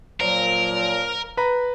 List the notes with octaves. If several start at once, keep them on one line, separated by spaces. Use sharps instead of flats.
A#2 F3 F#3 A#4
B4 A#5 B5